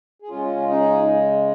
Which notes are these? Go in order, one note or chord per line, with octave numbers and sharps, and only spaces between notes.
G#4
C#3 G#3 C#4 F4
D#4 G#4